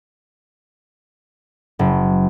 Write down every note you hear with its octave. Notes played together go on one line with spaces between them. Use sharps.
F#1